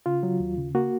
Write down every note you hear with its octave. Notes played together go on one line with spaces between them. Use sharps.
C#3 F4
F#3
D#2
C#3
A#3 F#4